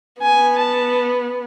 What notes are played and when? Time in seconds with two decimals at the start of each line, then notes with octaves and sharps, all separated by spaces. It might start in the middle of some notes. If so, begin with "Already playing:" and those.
0.22 B3 G#5
0.58 A5